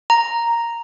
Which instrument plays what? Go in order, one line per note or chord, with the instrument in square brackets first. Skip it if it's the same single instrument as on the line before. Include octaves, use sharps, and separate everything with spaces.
[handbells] A#5